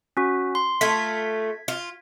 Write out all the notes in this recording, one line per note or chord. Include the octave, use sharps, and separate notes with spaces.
C#4 F#4
C6
A3 F4 G#6 B6
F4